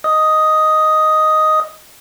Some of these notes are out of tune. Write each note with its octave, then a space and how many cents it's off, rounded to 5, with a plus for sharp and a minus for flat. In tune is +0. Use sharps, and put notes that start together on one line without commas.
D#5 +0 D#6 +5